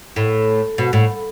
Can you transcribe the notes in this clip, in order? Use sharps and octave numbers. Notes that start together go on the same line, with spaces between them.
A2
B2
A2